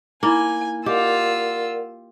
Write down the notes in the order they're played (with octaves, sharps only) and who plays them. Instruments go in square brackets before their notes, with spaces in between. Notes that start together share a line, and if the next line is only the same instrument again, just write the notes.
[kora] A#3 [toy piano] D#4 E4 B5 [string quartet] G#5
[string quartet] F4 E6 [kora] G4 [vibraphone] A#4 D5 F#5 [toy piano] D#5